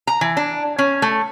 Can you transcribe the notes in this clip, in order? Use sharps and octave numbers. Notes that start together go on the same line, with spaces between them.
A#5
E3
D4
C#4
A3